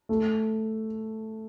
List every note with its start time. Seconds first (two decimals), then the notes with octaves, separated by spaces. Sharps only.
0.09 A3